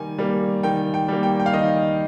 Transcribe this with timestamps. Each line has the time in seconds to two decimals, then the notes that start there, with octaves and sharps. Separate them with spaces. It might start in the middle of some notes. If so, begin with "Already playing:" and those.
Already playing: D#3 G3 A#3 G#5
0.19 G3 A#3
0.63 D#3 G5
0.94 G5
1.08 G3 A#3
1.23 G5
1.39 G5
1.46 F5
1.53 D#3 D#5